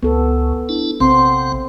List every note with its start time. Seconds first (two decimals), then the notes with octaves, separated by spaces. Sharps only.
0.03 C#2 B3 A4
0.69 D4 E4
1.00 A#1 C3 C4 F#5 C6